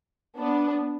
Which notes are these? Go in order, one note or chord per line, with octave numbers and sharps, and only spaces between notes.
B3 D4